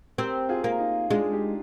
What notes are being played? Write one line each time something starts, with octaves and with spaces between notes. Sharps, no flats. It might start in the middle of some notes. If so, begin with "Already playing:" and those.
C4 G4 A#4
F4 G#4
A#3
D#4
G#3 D4 F4
D#4 G4